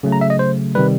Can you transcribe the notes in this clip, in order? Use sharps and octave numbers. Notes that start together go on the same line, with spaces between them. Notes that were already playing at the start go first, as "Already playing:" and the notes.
C#3 F#3 A3
A#5
E5
D#5
C5
C3 D#3 G3 B4